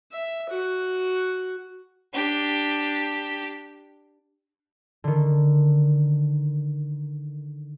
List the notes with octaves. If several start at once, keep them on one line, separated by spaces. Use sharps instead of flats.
E5
F#4
D4 G4
D3 D#3